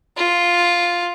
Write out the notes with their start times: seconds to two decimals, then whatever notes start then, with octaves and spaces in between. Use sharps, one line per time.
0.17 F4